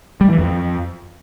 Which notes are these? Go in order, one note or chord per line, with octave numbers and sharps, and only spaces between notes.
G3
E3
F2